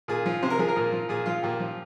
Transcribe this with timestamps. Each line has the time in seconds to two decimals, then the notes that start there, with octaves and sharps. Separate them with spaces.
0.08 A#2 G#4
0.26 F3
0.42 C3 C5
0.50 A#4
0.59 F3 G#4
0.68 A#4
0.76 A#2
0.92 F3
1.09 A#2 G#4
1.26 F3 F4
1.43 A#2 G4
1.60 F3